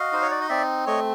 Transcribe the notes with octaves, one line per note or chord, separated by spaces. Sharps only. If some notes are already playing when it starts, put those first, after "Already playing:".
Already playing: F#4 D#5 F5
D#4 C5
C#5
D5
D#5
C4 D5 E5
A3 C#5 D#5